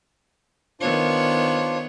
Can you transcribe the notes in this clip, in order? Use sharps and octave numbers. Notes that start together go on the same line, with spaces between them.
D#3 B3 D4 F4 C5 C#5